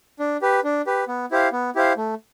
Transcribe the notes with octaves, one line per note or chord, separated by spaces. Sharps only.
D4
G4 B4
D4
G4 B4
B3
E4 G4 C5 F5
B3
E4 G4 C5 F5
A3